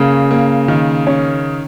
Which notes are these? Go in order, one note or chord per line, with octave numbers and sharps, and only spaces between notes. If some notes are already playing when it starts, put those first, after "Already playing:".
Already playing: C#3 A#3
A#3
D#3
C#4